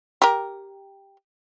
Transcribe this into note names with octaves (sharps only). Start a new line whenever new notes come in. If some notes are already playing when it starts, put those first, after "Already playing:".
G4 A#4